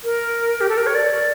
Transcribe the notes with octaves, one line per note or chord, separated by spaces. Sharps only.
A#4
G4
A4
A#4
C#5
D5